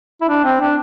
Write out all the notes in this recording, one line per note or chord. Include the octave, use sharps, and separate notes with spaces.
E4
D4
C4
D4